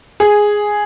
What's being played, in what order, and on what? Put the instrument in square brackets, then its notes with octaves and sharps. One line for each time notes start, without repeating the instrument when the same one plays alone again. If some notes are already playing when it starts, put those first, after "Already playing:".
[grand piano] G#4